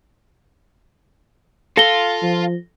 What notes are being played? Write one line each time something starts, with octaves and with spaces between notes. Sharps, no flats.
F4 A4 A#6 G7
F3